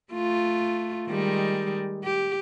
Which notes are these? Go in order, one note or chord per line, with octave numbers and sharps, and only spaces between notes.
A3 F4
D#3 G3 G#3
G4